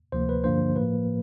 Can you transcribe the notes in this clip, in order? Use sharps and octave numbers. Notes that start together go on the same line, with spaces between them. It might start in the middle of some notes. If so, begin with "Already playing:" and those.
D2 C3 F3 A#3 C5
B4
G2 D3 F3 A#3 D4 C5
A2 F3 A#3 B4